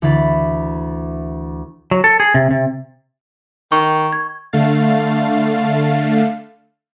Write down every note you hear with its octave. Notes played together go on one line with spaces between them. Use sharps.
D2 E3 B5 A6
F#3
A4
G#4
C3
C3
D#3 C#6
G#6
D3 A3 F5 A6